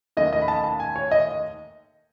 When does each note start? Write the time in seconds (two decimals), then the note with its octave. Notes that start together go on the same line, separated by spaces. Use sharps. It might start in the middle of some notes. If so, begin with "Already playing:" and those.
0.17 D#2 D#3 A3 C#4 D#5
0.33 D#5
0.42 B5
0.48 A5
0.64 A5
0.80 G#5
0.96 C#5
1.11 D#5